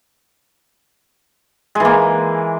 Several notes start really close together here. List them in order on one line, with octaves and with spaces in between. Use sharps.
G#3 E3 A#3